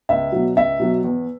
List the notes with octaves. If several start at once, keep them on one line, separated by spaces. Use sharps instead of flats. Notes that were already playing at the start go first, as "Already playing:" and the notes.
C#2 E5
B2 F#3
C#2 E5
B2 F#3
E2